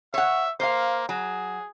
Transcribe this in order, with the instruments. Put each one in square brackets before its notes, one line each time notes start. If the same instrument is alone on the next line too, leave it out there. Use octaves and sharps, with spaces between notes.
[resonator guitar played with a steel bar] C#5 F#5 [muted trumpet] E5
[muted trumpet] A#3 [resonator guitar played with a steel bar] C5 F5
[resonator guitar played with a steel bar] F#3 [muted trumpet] G#4